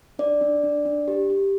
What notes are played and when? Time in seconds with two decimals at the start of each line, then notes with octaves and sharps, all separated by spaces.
0.19 D4 D5
0.41 D4
0.63 D4
0.86 D4
1.08 G4
1.30 G4